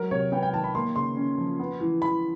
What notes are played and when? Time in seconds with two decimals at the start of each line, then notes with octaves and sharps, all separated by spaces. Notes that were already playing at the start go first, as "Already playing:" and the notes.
Already playing: F#3 A#4
0.11 C3 C#5
0.32 B3 G5
0.42 G5
0.53 D#3 A5
0.64 B5
0.75 A#3 C6
0.96 C#3 C6
1.17 C#4
1.38 F3
1.59 B3
1.80 E3
2.02 E3 B5